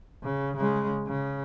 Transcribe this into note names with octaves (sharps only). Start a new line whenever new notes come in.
C#3
C#3 G#3
C#3